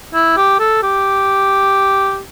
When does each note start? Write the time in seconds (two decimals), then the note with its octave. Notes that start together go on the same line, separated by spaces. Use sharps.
0.14 E4
0.37 G4
0.60 A4
0.83 G4